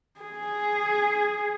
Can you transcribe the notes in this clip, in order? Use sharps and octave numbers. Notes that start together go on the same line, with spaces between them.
G#4